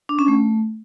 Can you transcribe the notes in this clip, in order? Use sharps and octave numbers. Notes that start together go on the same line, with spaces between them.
D4
C#4
A3